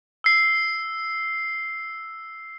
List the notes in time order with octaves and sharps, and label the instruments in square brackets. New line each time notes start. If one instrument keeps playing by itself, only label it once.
[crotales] E6 C7